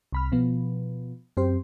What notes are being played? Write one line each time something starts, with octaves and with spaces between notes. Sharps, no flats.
C2 B5 F6
B2 F3 B3
F#2 C4 G4 C5